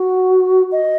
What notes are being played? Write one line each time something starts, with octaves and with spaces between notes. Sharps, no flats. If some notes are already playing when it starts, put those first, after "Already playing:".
Already playing: F#4
D#5